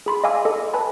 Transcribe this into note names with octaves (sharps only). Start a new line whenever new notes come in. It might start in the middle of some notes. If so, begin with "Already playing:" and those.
G#4 B5 C6
D#5 F5 G#5 D6 E6
A4 D#5
B4 G#5 A5 B5